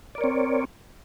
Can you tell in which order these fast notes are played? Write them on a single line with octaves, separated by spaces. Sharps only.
D5 A#4 C#5 C4